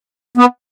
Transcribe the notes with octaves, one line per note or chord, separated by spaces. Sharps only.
B3